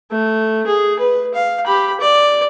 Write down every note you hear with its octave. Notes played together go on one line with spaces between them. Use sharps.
A3
G#4
B4
F5
G4 B5
D5